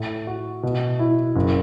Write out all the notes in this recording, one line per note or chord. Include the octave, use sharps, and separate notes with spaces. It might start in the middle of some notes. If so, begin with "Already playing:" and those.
Already playing: A2
F#4
B2
E4
F#1